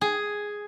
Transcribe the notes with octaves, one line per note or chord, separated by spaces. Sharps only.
G#4